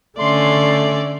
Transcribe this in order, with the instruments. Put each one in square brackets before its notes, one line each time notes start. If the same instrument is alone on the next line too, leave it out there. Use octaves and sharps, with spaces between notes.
[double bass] D3 [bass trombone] A3 [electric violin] C#4 D5 [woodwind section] C6